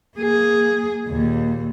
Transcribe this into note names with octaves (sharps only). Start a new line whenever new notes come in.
A#3 G#4
D#2 A#2